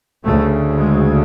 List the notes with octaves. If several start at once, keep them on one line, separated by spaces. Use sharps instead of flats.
D2 C#3 A3
G#3